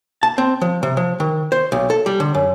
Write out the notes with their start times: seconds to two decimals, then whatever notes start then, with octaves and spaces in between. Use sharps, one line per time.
0.23 A5
0.38 C4
0.61 F3
0.83 C3
0.97 F3
1.20 D#3
1.52 C5
1.72 B1
1.90 A4
2.06 G3
2.20 D3
2.35 F#2